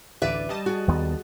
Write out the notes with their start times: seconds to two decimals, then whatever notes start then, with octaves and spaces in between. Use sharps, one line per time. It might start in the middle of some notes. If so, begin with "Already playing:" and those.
0.22 A1 D2 B4 D5 E5
0.49 G3 D#5 A5
0.66 F#4 G#4
0.88 D#2 D#3 B3